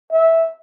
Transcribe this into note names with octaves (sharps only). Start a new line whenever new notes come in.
E5